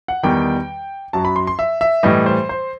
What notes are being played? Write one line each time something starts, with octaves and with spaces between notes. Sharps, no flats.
F#5
E2 D#3 G3 G5
F#2 F#3 A5
B5
C6
C6
E5
E5
A2 E3 G3 D#5
C5
C5